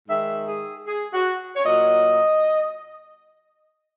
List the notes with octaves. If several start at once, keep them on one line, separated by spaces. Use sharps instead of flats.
G#2 D#3 G#3 E5
G#4
G#4
F#4
C#5
A#2 F#3 D#5